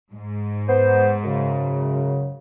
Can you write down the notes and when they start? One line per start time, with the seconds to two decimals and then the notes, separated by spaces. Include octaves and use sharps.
0.13 G#2
0.68 B3 C5
1.24 F#2 C#3